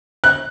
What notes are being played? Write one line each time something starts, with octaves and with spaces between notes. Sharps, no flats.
F#6